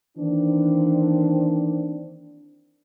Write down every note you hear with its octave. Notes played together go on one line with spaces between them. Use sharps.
D#3 E3 A#3 C4 D4